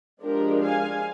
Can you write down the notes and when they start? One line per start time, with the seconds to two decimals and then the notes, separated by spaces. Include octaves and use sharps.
0.23 F3 G#3 D4 G4 A#4
0.65 F5 G#5